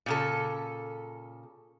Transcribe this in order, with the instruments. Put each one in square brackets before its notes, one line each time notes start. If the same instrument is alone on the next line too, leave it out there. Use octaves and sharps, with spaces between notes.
[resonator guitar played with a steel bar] A#2 C#3 A4